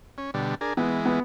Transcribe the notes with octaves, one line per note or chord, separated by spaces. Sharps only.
C#4
B2 D3 G3
D4 G#4 A#4
E3 G#3 B3
B3